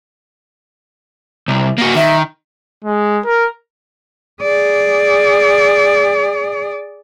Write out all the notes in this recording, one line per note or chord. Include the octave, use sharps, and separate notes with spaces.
C2
A#3 F#4
D#3 E5
G#3
A#4
G#4 D5